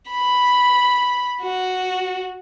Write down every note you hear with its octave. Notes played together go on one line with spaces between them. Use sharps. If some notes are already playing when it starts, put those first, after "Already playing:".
B5
F#4